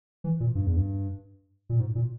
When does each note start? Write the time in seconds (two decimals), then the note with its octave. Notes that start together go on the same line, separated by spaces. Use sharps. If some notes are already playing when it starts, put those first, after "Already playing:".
0.24 E3
0.40 A#2
0.55 G2
0.66 E2
0.77 G2
1.69 A#2
1.80 G#2
1.95 A#2